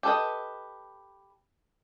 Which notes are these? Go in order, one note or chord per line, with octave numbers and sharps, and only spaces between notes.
G4 A4 B4 D#5